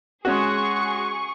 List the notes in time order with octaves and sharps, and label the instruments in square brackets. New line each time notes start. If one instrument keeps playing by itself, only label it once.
[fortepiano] G#3 C#4 F#4 [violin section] G#4 C#6